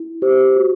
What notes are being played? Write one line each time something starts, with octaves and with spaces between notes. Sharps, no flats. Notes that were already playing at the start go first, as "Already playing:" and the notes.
Already playing: E4
G4 C5
F#4